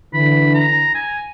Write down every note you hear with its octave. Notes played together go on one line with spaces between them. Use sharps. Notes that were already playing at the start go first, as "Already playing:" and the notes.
D3 E3 B5
A#5
G#5